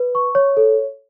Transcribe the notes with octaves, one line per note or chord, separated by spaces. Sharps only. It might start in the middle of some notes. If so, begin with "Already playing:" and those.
Already playing: B4
C#6
C#5
A4